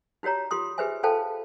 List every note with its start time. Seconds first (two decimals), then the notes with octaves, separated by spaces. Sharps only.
0.23 D#4 F#4 G4 C#5 A#5
0.51 F4 G4 C6 D#6
0.78 G4 G#4 B4 C5 E5 G#5
1.03 F4 A4 C5 F5 G5 A5